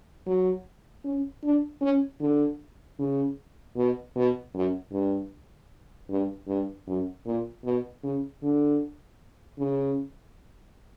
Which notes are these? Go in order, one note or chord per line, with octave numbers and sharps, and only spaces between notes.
F#3
C#4
D4
C#4
D3
C#3
B2
B2
F#2
G2
G2
G2
F#2
A#2
B2
C#3
D3
C#3